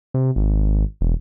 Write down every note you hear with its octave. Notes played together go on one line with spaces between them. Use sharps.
C3
G#1
E1